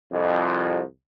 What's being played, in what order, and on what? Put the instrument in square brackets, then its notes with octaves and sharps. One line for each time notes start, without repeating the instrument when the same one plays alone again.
[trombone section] C2 F2